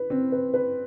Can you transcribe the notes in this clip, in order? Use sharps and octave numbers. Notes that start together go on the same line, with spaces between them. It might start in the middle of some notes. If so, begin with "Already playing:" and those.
Already playing: B4
C4
B4
B4